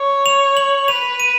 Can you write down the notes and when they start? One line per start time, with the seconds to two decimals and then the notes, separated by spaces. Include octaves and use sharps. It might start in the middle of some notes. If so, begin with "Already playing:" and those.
Already playing: C#5
0.26 F7
0.57 F#7
0.88 B4 F7
1.20 D#7